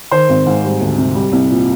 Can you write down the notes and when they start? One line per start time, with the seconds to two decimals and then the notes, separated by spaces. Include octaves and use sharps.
0.11 D#3 C5
0.29 G#1
0.46 G#2
0.63 G3
0.81 D2
0.98 C3
1.15 G3
1.32 C2
1.50 A#2